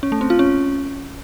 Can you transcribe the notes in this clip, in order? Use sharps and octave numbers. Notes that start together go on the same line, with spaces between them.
C#4
A3
C4
F4
C#4